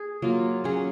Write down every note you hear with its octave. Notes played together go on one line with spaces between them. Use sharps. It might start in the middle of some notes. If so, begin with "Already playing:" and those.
Already playing: G#4
F#3 A#3 F4
F#3 C#4 G#4